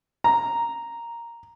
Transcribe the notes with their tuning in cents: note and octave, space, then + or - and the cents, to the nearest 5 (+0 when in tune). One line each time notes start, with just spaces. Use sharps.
A#5 +0